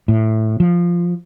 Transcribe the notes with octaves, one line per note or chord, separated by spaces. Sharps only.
A2
F3